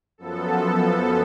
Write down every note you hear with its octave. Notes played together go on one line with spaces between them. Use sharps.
F#2 F3 B3 A4